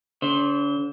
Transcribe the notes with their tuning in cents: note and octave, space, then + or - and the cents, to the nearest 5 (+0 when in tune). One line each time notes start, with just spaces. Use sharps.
D3 -45 C5 +15